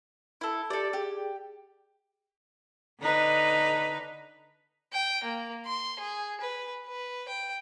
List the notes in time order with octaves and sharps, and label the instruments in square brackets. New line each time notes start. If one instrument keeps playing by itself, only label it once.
[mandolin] E4 A4
[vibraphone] G4 [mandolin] A4 D5
[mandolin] G4 [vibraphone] G#4
[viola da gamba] D3 D#4 B4
[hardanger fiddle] G5
A#3
C6
G#4
B4
B4
G5